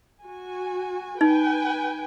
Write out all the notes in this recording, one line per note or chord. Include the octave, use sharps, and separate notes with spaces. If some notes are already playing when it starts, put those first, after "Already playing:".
F#4 G#5
D#4 B4 G5 G#5